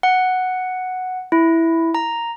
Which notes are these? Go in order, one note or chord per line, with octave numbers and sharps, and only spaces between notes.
F#5
E4
A#5